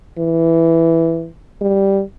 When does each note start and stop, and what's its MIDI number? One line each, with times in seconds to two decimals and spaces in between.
0.19 1.29 52
1.62 2.01 55